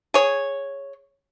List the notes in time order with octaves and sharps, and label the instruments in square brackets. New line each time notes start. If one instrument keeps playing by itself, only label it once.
[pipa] G#4 C#5